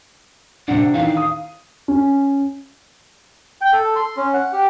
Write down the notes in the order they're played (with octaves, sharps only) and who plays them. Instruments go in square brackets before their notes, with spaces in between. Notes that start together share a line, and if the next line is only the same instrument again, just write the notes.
[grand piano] C3 D4 [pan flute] F#5
[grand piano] D#3 E3 D4 [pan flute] F5
[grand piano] D#6
C#4
[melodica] G5
A4
C6
C#4
F#5
G4